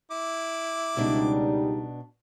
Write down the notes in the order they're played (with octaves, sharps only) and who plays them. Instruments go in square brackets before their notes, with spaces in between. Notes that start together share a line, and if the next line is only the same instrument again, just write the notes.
[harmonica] E4 D6
[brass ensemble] C#2 G3 D#4 [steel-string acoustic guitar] B2 D4